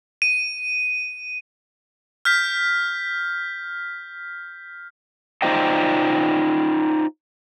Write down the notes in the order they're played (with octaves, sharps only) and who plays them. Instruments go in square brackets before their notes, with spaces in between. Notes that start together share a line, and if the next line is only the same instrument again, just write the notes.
[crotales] D#7
F6 G6 B6
[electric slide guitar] D#4 F4 C5 D5 D#5 G5